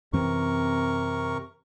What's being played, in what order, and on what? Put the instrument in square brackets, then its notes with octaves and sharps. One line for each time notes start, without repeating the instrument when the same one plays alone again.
[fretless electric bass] F#2 E3 C4 [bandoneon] C3 A#4 C#6